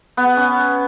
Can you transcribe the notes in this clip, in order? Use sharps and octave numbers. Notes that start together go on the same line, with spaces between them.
B3
C#4